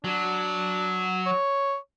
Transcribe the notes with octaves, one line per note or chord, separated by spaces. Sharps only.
F#3 D4
C#5